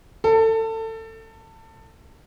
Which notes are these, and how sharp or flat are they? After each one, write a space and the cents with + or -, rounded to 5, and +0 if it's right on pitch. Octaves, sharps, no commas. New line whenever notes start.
A4 +25